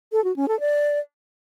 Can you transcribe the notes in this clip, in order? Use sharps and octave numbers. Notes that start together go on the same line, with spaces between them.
A4
F#4
C#4
A4
D5